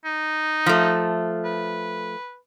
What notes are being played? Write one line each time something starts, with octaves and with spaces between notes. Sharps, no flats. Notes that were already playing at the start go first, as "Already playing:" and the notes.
D#4
F3 A3
B4